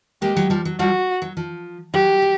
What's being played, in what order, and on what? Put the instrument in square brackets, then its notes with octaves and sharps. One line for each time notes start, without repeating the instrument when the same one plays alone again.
[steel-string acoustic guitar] G#3 A#3 [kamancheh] G4
[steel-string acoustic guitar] F#3 G#3
F3 G3
F#3
[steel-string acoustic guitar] F3 G3 [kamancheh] F#4
[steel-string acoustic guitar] F#3
F3
[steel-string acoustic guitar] F#3 [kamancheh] G4
[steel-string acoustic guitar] F#3